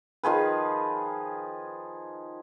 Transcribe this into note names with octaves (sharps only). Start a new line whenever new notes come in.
D#3 F3 G#4 B4